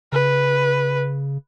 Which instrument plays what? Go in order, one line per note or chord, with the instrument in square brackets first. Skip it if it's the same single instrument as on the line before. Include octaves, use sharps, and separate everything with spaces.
[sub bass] C#3 [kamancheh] B4